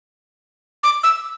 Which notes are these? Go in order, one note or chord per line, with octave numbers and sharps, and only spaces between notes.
D6
E6